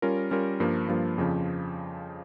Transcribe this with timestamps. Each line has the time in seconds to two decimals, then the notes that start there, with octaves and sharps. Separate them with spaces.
0.02 G3 C#4 F4 A#4
0.31 G3 C#4 F4 A#4
0.60 G2 F3 A#3
0.88 G2 F3 A#3
1.18 F2 C#3 F3